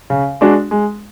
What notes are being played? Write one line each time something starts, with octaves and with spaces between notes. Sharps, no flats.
C#3
G#3 D4 F#4
G#3